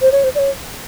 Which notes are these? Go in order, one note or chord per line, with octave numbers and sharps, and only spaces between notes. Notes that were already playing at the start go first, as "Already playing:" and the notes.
C5
C#5
C5
D5
C#5